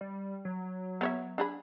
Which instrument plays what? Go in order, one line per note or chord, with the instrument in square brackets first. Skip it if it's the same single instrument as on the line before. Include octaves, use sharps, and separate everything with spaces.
[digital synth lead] G3
F#3
[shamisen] B3 C#5 E5
D4 G#4 B5